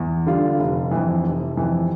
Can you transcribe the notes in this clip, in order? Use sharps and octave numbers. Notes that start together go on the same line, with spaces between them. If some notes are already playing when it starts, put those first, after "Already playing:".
Already playing: E2
D3 G3 D4 F4
F1
F2 E3
F1
F2 E3